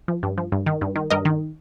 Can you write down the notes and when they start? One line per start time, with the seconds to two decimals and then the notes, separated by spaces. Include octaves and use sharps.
0.08 F3
0.23 G2
0.38 F3
0.52 G2
0.66 D#3
0.81 G2
0.96 D#3
1.10 G2 A#4 D#5
1.25 D#3